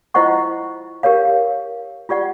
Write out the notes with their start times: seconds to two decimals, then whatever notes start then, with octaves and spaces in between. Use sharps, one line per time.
0.14 E4 F4 C5 D#5 F#5 C#6
1.03 G4 A#4 C#5 F5
2.09 F4 G4 D5 F#5